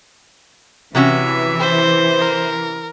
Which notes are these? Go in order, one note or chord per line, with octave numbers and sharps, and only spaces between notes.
C3 E3 C#4 F#4 E5
C5
A#4